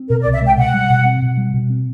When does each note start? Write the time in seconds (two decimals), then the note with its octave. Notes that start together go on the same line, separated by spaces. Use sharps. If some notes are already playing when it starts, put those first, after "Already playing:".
Already playing: C4
0.09 B2 A#4
0.21 D5
0.26 C2
0.33 E5
0.42 G#3 G5
0.58 B2 F#5
0.74 G3
0.90 B2
1.05 C4
1.22 B2
1.37 G3
1.54 B2
1.70 C4